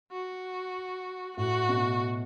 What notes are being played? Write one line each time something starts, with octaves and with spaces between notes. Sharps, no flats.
F#4
A2 F#4
B2